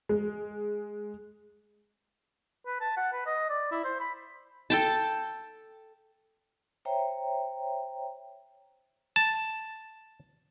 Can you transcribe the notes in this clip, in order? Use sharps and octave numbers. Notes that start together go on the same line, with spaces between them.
G#3
B4
A5
F#5
B4
D#5
D5
E4
C5
B5
A4 G5 A5
C5 C#5 E5 G5 A#5
A5